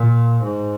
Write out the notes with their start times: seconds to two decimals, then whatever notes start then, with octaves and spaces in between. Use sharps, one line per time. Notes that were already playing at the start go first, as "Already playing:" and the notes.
Already playing: A#2
0.43 G#2